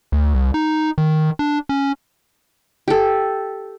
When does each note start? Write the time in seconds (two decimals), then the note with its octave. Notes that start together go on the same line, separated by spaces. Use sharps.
0.12 D2
0.34 C2
0.54 D#4
0.98 D#3
1.39 D4
1.69 C#4
2.88 G4 A4